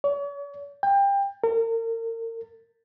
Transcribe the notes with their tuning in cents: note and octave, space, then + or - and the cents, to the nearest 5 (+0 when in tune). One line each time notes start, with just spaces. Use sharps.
C#5 +45
G5 +25
A#4 -35